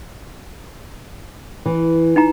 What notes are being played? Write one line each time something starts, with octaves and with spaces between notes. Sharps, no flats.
E3
D#4 G5 A#5